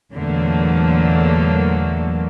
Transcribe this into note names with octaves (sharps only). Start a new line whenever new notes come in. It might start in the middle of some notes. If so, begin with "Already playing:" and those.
E2 A#2 D3 F#3 A3 A#3